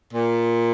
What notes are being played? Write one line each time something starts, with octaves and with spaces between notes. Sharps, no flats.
A#2